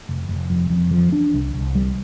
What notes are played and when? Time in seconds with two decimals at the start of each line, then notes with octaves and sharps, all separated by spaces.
0.09 F1
0.29 F1
0.50 F2
0.70 F2
0.91 F3
1.12 D4
1.34 C2
1.54 C2
1.75 G3